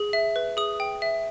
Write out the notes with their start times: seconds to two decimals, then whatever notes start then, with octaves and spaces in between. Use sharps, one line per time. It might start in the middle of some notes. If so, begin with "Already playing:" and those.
Already playing: G#4
0.13 E5
0.36 B4
0.57 G#4 D#6
0.80 G5
1.02 E5